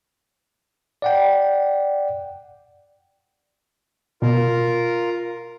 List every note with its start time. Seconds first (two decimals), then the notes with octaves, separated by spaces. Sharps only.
1.02 D5 F#5 G5
4.22 B2 F4 A#4